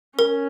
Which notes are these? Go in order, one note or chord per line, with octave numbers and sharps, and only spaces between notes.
C#4 A#4